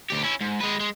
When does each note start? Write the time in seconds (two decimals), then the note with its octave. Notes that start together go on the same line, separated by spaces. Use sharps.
0.10 D2 G4
0.23 C#4 E4
0.41 G#2
0.60 G#3 B4
0.80 G#3